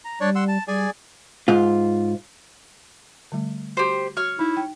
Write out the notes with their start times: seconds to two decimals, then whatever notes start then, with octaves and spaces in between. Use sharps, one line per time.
0.05 A#5
0.21 G3 D4 C#5 D5
0.35 F#5 C6 E6
0.48 A5
0.68 G3 G#4 D5 G#5
1.48 G#2 F4
3.32 D3 G3 A3
3.77 F#4 G4 C5
4.17 F#4 C#5 F6
4.39 D#4 E4
4.57 G5